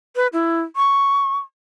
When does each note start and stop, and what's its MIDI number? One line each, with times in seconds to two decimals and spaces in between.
0.16 0.27 71
0.33 0.61 64
0.76 1.37 85